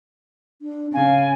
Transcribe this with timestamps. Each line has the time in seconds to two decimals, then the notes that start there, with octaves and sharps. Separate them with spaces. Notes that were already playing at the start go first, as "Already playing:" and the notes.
0.62 D4
0.94 C#3 F5 G#5